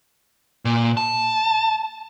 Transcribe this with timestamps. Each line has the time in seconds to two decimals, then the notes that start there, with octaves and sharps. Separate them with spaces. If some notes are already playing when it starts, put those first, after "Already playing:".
0.65 A#2
0.97 A5